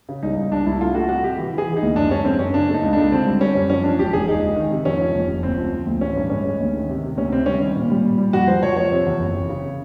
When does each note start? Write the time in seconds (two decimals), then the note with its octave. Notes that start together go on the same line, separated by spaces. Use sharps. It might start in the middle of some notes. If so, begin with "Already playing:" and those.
0.09 C#3
0.22 C2 D#4
0.37 C2
0.51 C2 D4
0.66 C2 E4
0.81 A3 F4
0.95 A3 F#4
1.09 C3 F#4
1.23 C3 G4
1.38 E3
1.53 E3 G#4
1.68 E3
1.77 D#4
1.82 D2
1.96 F#2 D4
2.10 G#3 C#4
2.25 F#2 C4
2.39 F#2 C#4
2.54 C#3 D4
2.68 A3
2.74 D#4
2.83 C#2
2.93 C#2 D4
3.12 D3 C4
3.26 G3
3.41 G3 C#4
3.55 F#2
3.70 F3 C#4
3.84 F3 D4
3.99 E1 G4
4.13 E1 G#4
4.28 C#2 D#4
4.42 C#2
4.56 D#3
4.71 C3
4.85 F2 C#4
5.01 F3
5.14 F1
5.29 F1
5.43 D2 C4
5.58 F3
5.73 F3
5.86 D2
6.01 A1 C#4
6.16 G2
6.30 G#3 C#4
6.45 G#3
6.60 D2
6.74 D#3
6.89 C3
7.03 C3
7.17 D2 C#4
7.32 C3 C4
7.46 G3 C#4
7.61 D#3
7.76 A#2
7.90 G3
8.05 A#2
8.18 G3
8.33 F2 F#4
8.47 F3 C5
8.62 F3 C#5
8.76 F3 C#5
8.92 C3
9.06 E2
9.20 F#1
9.34 C3
9.49 C#3